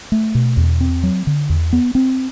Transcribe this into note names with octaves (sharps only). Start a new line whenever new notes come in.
A3
B2
E2
C4
F#3
D3
E2
B3
C4